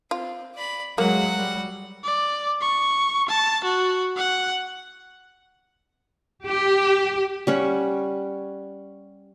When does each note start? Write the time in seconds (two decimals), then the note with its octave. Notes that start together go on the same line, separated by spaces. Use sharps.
0.11 C4 F4
0.55 D5 B5
0.98 F#3 G#3 A#3 F#4 F#5
1.38 G3
2.04 D5
2.61 C#6
3.28 A5
3.64 F#4
4.16 F#5
6.46 G4
7.47 G3 C#4 F#5